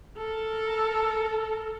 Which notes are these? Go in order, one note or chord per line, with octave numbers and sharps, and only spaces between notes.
A4 A#4